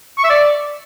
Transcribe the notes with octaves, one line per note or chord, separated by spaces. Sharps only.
C#6
E5
D5